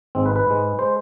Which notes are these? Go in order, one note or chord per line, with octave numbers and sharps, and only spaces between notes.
G#1 G#2 G#3 C4
B4
B4
G#2 G#3
G#3 C5